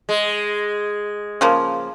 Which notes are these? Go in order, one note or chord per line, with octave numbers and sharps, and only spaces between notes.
G#3
C#3 F3 A#3